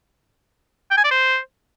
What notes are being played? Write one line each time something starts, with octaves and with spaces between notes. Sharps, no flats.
G5
G#5
D5
C5